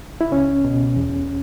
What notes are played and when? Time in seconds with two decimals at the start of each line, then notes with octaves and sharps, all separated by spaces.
0.21 E4
0.31 C#2 C#4
0.65 B2
0.96 E2